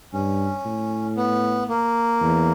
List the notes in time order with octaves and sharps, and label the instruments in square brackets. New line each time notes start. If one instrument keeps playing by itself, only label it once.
[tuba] G2 [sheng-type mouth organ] C#4
[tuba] A2
[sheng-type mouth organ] B3
A#3
[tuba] E2